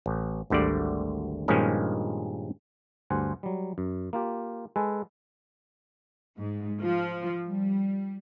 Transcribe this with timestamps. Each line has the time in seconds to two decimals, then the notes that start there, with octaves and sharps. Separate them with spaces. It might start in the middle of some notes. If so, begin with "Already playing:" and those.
0.06 A1
0.50 G#1 D2 D3 G3 D5
1.48 G2 A#2 D#3 F3 G#3 C#4
3.10 D2 G2 C5 F#5 G#5
3.43 F#3 G3
3.78 F#2
4.13 A#3 F4 G4
4.76 G#3 A4 B4 G#5
6.38 G#2
6.81 F3
7.45 G3